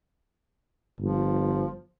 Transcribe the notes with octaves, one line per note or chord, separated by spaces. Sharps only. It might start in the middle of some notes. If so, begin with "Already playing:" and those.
G1 F3